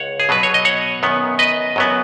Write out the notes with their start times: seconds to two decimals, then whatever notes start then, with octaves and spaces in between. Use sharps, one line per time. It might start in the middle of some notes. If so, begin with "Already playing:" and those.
Already playing: C#2 C#5 F#5
0.20 G#4
0.29 B2 F#3 B3 B4
0.43 C#5
0.54 D#5
0.65 C#5 F#5
1.03 F#2 D#3 B3
1.39 B4 D#5
1.76 F#2 F#3 B3